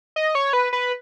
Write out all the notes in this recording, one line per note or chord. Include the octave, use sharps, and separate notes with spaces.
D#5
C#5
B4
B4